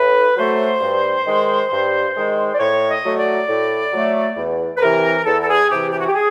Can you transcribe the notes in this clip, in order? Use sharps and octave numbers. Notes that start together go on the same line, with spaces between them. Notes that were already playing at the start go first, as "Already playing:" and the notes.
Already playing: A2 B4
F#3 A3 C5
G2
D#3 G#3
G2
D#3 G#3
D5
A2 C#5
D#5
F#3 A3
D5
A2
F#3 A3
E2
B4
C3 E3 A#4
E2 A4
A4
G#4
C3 E3 G4
G4
F#4
G4
G#4